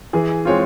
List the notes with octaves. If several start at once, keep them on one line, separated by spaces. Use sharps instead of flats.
E3 G#4
G#3 C4 F4 C#5